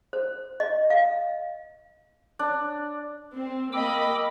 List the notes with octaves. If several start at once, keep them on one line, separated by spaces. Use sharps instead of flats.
C5
D#5
F5
D4
C4
A#3 D#5 G5 B5 D6 E6